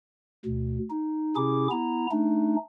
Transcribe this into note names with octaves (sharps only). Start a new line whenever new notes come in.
D2 B2
D#4
C3 C#4 E4 G#4 D6
B3 E4 A#5
A3 D4 D#4